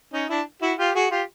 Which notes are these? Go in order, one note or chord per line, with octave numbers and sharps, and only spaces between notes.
C#4 D#4
D4 E4
E4 F#4
F4 G4
F#4 G#4
F4 G4